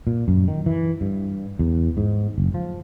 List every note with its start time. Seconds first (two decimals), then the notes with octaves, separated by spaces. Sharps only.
0.07 A#2
0.28 F#2
0.48 D#3
0.66 E3
1.01 G2
1.59 E2
1.97 G#2
2.38 F#1
2.54 F3